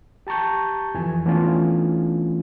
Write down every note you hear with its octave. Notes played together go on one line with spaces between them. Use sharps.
G4 A5 A#5 C#6 G6
F2 E3 G#5
E3 A3 B3 C#4 D4 F4